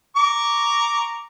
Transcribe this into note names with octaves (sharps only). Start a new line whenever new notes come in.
A#5 C#6 D6